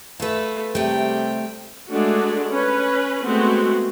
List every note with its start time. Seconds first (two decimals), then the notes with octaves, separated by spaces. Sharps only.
0.20 A3 F4 B4
0.75 C3 G3 A3 G5
1.91 G#3 A3 D4 F#4
2.51 C#4 B4
3.24 G#3 A3 B3 C4 F#4